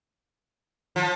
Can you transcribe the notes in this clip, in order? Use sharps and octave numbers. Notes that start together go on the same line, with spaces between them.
F3